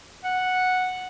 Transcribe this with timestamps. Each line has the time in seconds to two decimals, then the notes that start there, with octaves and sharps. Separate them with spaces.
0.24 F#5